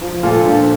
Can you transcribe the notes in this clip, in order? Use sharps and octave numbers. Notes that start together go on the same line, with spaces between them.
F3
A#2 F4 A4
F3 D4 F4